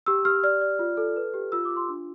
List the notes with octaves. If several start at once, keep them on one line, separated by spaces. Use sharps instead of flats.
G4 E6
G4 F6
D5 F6
D5
F4
A4
B4
G4
F4 E6
D6
F4
C6
D4